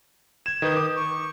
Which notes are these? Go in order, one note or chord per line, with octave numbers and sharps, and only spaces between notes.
G#6 E7
D#3 B4 D#6 G6
D6
C#6